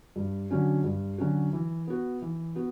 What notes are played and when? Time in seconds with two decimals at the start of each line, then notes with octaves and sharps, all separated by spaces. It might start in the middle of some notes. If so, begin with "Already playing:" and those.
0.16 G2
0.50 D3 F#3 C#4 F#4
0.84 G2
1.18 D3 F#3 C#4 F#4
1.53 E3
1.87 B3 F#4
2.22 E3
2.55 B3 F#4